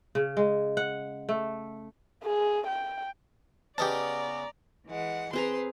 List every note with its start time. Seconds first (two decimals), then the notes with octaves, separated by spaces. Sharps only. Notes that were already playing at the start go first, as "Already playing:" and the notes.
0.15 C#3
0.37 G#3
0.77 F#5
1.29 A3
2.24 G#4
2.67 G5
3.78 C#3 B3 C#4 G4 D5 D#5 A5 A#5
4.87 E3 G#3 F#5
5.33 C4 G#4 B4 A#5 C6